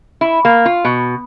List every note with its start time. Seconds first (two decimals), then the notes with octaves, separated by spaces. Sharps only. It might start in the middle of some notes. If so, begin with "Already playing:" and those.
0.21 E4
0.45 A#3
0.66 F4
0.85 B2